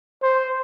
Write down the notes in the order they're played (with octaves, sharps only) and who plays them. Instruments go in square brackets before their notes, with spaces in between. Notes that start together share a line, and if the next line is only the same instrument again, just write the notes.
[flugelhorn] C5